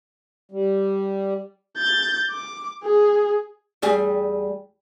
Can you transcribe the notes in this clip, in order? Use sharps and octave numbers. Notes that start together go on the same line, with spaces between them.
G3
G6 A6
D6
G#4
E2 G3 G#4